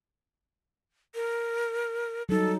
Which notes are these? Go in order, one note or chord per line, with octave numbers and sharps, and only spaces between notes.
A#4
F#3 G3 D#4 A4